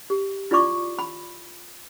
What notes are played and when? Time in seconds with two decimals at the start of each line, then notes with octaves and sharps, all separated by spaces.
0.10 G4
0.51 E4 F4 D5 B5 C#6 D6
0.99 B5